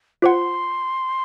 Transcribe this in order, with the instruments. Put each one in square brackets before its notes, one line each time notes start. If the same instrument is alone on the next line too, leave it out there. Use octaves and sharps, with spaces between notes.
[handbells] F4 C5 F#5 [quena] C6 D6